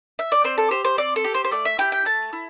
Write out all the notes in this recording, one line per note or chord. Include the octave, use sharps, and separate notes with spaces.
E5
D5
C4 C5
A4
G4 C5
C5
C4 D5
A4
G4
C5
C5
A3 D5
E5
E4 G4 G5
G5
A3 A5
E4